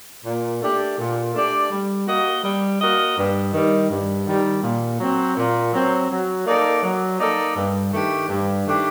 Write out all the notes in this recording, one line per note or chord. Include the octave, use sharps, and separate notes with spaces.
A#2
A3 D4 G4 D5
A#2
A3 D4 G4 D5
G3
A#3 F#4 A#4 D#5
G3
A#3 F#4 A#4 D#5
G2
D#3 G3
G2
D#3 G3
A#2
F#3 C4
A#2
F#3 C4
F#3
A#3 D#4 A4 D5
F#3
A#3 D#4 A4 D5
G2
D#3 A3 D4 G4
G2
D#3 A3 D4 G4